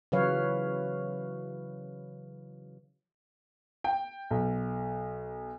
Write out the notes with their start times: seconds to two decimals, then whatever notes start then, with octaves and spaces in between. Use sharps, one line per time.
0.12 C#3 E3 F#3 B4 C#5 F5
3.84 G5
4.31 B1